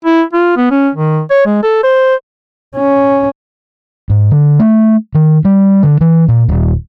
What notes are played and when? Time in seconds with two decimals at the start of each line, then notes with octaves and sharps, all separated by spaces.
0.05 E4
0.33 F4
0.57 B3
0.71 C#4
0.95 D#3
1.31 C#5
1.46 G#3
1.63 A4
1.84 C5
2.76 C#4
4.10 G#2
4.31 D3
4.60 A3
5.15 D#3
5.45 G3
5.83 D3
6.01 E3
6.28 A#2
6.48 D#1